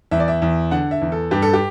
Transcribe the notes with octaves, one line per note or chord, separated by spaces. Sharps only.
E2 E5
D5
E5
E2
D3 F#5
E5
E2
A4
G2 G4
A4
G4